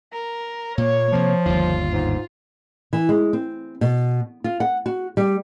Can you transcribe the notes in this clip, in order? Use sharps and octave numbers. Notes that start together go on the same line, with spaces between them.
A#4
A#2 A#3 C#5
C3 F3 A#3
G1 D#2 F4
G#2
E3
G#3
C4
B2
F4
F#5
F#4
G3